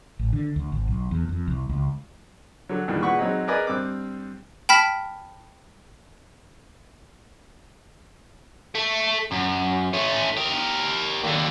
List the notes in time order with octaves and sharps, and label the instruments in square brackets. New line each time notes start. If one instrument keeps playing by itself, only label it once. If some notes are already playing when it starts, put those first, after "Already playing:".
[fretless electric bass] A1
D3
D2
G#1
B1
E2
F2
C2
C#2
[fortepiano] D3 F#3
E2 G2 A#2 D#3
A#2 C#3 B4 F#5 B5 C#6
F#3 G#3 C4 D#4
G#4 A#4 B4 D5 D#5 G#5
G2 C4 D6 F#6
[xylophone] G5 A5 B5 F6 B6
[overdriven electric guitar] A3
F#2
A3 C#4
G4 A#4
D#2 D3